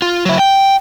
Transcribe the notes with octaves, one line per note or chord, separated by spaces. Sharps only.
F4
F#3 E4
G5